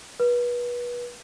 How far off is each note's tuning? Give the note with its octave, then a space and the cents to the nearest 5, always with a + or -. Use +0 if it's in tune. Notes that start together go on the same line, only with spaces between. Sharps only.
B4 -30